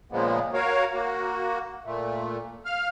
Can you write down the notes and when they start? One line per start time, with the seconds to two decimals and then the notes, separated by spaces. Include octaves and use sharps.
0.12 A#2 C#3 F3 G#3 A#3 B3
0.54 F#4 A#4 C#5 F5
0.93 A#3 F#4
1.85 A#2 A3
2.65 F5 F6